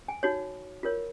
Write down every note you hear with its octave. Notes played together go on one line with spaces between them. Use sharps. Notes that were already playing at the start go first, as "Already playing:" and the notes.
G#5
D#4 F#4 C#5
F4 A#4 C#5